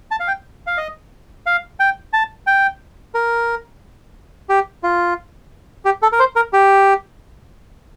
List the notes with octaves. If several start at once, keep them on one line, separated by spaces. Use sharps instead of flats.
A5
F5
G5
F5
D#5
F5
G5
A5
G5
A#4
G4
F4
G4
A4
A#4
C5
A#4
G4